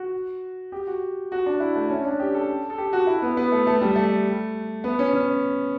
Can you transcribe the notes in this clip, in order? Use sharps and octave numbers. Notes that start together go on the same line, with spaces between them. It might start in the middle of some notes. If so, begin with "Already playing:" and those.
Already playing: F#4
G4
F#4
F#4
D4
E4
A3
C#4
D4
G4
A4
A4
G4
F#4
E4
B3
B3
A3
A3
G3
A3
B3
C#4
C#4